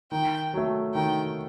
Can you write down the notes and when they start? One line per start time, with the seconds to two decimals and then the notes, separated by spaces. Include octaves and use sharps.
0.12 D#3 G5
0.54 F#3 A3
0.95 D#3 G5